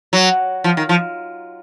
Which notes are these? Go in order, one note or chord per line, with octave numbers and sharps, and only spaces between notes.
F#3
F3
D#3
F3